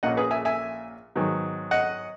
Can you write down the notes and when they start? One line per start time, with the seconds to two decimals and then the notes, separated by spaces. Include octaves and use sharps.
0.03 A#1 A#2 A#3 C#4 D#5 F#5
0.17 G#4 B4
0.31 E5 G#5
0.45 E5 G#5
1.15 G#2 D#3 F#3 B3
1.71 D#5 F#5